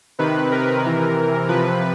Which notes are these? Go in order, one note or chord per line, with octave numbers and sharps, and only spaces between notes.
C3 D#3 B4
A#4
C3 E3
C3 F3 B4